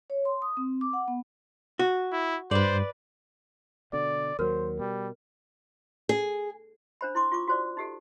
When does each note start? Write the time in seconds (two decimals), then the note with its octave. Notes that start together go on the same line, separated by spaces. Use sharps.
0.10 C#5
0.25 C6
0.42 D#6
0.57 C4
0.81 D6
0.93 F#5
1.08 B3
1.79 F#4
2.13 E4
2.51 G2 B4 C5 D5
3.93 B2 D3 D5
4.39 D#2 F#3 A#4 C5 F6
4.79 B2 G3
6.09 G#4
7.01 D4 C5 B5
7.15 E4 C6 D6
7.32 F4 C#6 D6
7.48 F#4 C5 D5
7.77 D#4 G4 A4